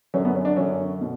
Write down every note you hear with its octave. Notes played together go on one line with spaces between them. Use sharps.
F#2 D3 C#4
B3
C#4
D4
F#2 D3 C#4
B2